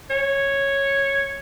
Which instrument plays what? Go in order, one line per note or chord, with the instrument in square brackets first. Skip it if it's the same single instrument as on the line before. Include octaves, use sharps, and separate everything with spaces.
[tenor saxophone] C#5